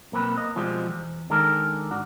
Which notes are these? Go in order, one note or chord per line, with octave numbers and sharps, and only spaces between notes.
B1 A#3 C4 B4
A#3 D#5
B2 F3 G3 G#3 B3 C4
E2
D#3 G#3 D4 A4 A#4
G#2 D4 F#4